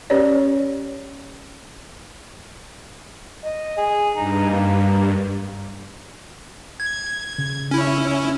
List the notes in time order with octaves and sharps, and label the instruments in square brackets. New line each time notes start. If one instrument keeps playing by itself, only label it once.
[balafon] C#4 G4 B4 C#5 D5
[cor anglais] D#5
G#4
[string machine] G2 [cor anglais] D#4
[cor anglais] A#3
[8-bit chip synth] G#6
[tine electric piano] C#3
[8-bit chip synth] C#4 E4